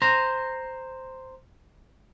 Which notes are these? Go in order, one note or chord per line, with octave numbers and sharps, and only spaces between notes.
C5 A#5